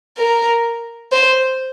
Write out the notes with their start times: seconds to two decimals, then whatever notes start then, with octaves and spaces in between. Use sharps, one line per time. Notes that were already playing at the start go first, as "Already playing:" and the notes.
0.18 A#4
1.12 C5